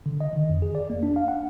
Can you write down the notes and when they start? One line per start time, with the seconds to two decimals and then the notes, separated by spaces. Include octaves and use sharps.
0.06 D3
0.20 D#5
0.33 D#3
0.50 F2
0.62 G#4
0.75 D5
0.90 A#3
1.03 D4
1.16 F5
1.28 F#5